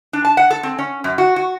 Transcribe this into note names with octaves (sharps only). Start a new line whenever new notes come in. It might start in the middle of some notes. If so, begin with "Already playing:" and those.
D4
A5
F#5
A4
C4
C#4
F#2
F#4
F#4